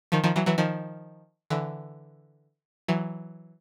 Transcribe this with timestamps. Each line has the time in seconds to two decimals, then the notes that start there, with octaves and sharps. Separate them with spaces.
0.12 D#3 F3
0.24 D#3 F3
0.36 E3 F#3
0.46 E3 F#3
0.58 D#3 F3
1.50 D3 E3
2.88 E3 F#3